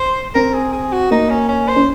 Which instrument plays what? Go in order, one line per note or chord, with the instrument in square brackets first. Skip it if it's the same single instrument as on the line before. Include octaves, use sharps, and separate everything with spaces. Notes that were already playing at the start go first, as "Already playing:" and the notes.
Already playing: [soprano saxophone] C5
[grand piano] C4 [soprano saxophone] A#4
[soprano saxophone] G#4
G#4
F#4
[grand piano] A#3 [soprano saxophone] D#4
[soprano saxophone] C#4
C#4
C5
[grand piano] C#4